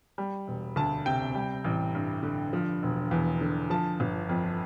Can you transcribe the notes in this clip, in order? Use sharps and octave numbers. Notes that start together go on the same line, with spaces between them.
G3
E1
D2 A5
C3 G5
G3
A1
G2
D3
F3
E1
E2
D3
F3 A5
G1
F2